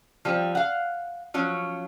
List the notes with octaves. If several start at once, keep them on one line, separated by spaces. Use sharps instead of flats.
F3 G3 C4
F5 F#5
F3 F#3 C#4